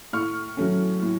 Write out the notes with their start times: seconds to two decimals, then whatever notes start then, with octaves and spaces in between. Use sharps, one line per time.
0.13 A2 C#6 F6
0.57 F#3 A3 C#4
1.02 A2